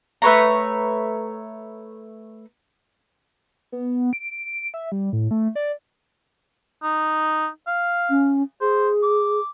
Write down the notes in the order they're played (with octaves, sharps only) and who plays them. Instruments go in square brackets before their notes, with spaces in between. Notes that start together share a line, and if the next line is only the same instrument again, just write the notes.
[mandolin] A3 B4 C#5 A#5
[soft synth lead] B3
D7
E5
G3
A2
A3
D5
[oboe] D#4
F5
[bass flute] C#4
[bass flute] G#4 [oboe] C5
[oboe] D6